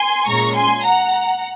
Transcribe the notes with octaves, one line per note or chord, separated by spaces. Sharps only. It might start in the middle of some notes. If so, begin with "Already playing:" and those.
Already playing: G#5 C6
A#2 G#3 C#4 A#5 C#6
G#5 C6
F#5 A#5